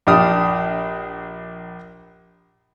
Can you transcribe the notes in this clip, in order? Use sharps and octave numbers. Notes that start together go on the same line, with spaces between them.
A#1 D4 G4 G5 D#6 F6